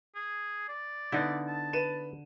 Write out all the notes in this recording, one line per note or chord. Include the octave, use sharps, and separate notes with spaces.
G#4
D5
D3 B3 D#4 E4
A5
B4 D#7 E7